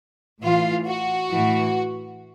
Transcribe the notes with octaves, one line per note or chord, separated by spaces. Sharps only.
A2 E3 F4
F#4
A2 E3